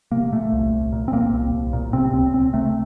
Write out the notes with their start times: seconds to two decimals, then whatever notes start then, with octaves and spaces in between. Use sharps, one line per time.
0.12 C3 A#3
0.32 A#2 A3
0.53 C2
0.73 C2
0.92 A#2
1.08 C4
1.13 A#2 A#3
1.33 C2
1.54 C2
1.73 A#2
1.93 C3 C4
2.13 C#2 C4
2.33 C#2 C4
2.53 C3 A3